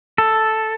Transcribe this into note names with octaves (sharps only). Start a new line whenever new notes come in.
A4